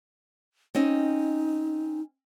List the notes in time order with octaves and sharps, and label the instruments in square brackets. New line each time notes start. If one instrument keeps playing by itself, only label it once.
[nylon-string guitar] C4 C#4 D#5 [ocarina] D#4